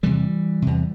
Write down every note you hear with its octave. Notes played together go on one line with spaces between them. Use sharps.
E2 C3 E3 G3
E2 C3